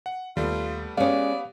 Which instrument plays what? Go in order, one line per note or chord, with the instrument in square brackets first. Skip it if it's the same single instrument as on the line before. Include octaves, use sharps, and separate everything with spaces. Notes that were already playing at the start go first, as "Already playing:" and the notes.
[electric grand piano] F#5
[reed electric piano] D#2 [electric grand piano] G3 A3 B3 [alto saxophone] F4
[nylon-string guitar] G#3 C#4 [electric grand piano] B3 G4 [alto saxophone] D5 [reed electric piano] F5